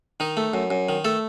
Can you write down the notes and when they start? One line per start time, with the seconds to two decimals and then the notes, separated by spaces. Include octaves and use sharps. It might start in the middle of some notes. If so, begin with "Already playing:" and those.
0.20 D#3 D#4
0.37 A3
0.54 F#2
0.70 F#2
0.89 D#3
1.05 A3 A4